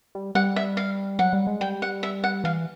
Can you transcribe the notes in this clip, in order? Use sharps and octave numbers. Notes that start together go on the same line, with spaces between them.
G3
G3 F#5
E5
F5
F#3 F#5
G3
G#3
G3 G5
F#5
E5
F#5
E3 F5